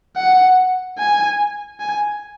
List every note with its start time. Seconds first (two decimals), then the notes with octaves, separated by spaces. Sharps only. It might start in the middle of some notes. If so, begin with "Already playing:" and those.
0.16 F#5
0.99 G#5
1.80 G#5